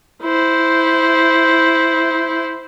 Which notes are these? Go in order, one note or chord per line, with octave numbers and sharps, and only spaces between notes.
E4 C5